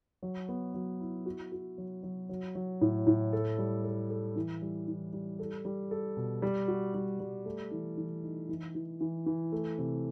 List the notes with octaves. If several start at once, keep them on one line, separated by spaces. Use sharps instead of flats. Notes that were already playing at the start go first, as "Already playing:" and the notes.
F#3
B3
F#3
E4
F#4
F#4
F#3
F#3
F#3
F#3
A2
A2
A4
G3
A4
A4
E3
G3
E3
G3
A4
G3
A4
B2
G3
F#4
G3
G3
A3
E3
E3
D#4
E3
E3
E3
E3
A3
C3